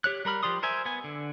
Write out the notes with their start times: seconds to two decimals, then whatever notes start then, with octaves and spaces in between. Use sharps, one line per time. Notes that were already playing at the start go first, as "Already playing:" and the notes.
0.04 G4 C#5 F#6
0.25 G3 A#4 B5 F6
0.43 F3 G4 D5 C6 D#6
0.63 A#4 C5 E5 G#5
0.85 B3 G#5
1.04 D3